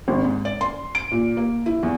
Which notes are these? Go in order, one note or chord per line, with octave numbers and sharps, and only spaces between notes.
G#1
G#2
D5
C6
D7
A#2
A#3
E4
E2